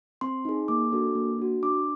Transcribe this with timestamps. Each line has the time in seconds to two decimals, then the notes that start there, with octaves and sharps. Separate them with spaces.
0.21 C4 C6
0.45 D#4 G#4
0.68 A#3 D6
0.92 D4 F#4 A4
1.15 A#3
1.39 D4 F#4
1.63 D4 D6